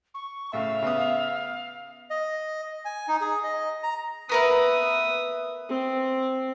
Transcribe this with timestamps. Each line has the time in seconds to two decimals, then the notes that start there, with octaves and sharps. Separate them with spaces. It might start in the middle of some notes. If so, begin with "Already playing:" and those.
0.14 C#6
0.53 A2 C#3 E5 F5
0.82 C#3 B3 D#6
2.10 D#5
2.85 G#5
3.08 D#4
3.21 G#4
3.44 D#5
3.83 A#5
4.29 B3 A#4 B4 E5 D#6
5.69 C4